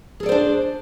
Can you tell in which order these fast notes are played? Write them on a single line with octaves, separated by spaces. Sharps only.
G#4 A4 D5 C5 D4